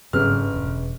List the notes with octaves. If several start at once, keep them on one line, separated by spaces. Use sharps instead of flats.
G1 G#2 C#3 F#3 C#4 G#4 B4 F6
E1